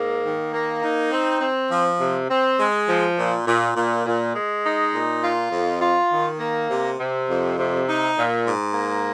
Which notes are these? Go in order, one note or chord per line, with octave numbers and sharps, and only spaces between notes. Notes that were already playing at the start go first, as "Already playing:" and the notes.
Already playing: G#2 A#3
D#3
A#3
D#4
C4
C4
F3
C3
C4
G#3
F3
A#2
A#2
A#2
A#2
G#3
D#4
A#2
F4
F2
F4
D#3
A#3
C3
C3
F2
C3
D#4
A#2
G#2
A#3